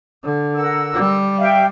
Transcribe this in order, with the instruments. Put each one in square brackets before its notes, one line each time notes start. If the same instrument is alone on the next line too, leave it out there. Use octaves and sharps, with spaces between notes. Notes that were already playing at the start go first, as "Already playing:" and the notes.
[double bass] D3
[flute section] A#4 F#5 E6
[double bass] G3
[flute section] E5 F5 G5